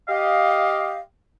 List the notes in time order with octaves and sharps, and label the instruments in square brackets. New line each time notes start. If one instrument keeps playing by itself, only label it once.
[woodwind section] G4 D#5 F5